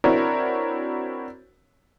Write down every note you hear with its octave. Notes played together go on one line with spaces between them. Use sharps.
C4 D4 E4 F#4 A#4 C#5